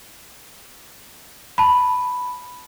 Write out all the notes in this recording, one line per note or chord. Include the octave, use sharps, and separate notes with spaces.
A5 B5